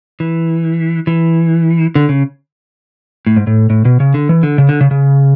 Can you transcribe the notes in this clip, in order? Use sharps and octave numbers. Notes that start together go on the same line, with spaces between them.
E3
E3
D3
C#3
A2
G#2
A2
A2
B2
C#3
D3
E3
D3
C#3
D3
C#3
C#3